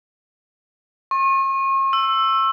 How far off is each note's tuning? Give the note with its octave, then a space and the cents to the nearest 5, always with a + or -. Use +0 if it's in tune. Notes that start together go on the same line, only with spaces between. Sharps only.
C#6 -40
E6 +10